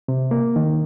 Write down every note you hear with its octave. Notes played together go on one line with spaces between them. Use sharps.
C3
A#3
D#3